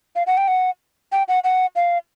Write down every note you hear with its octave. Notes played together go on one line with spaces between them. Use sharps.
F5
F#5
G5
F#5
G5
F#5
F#5
F5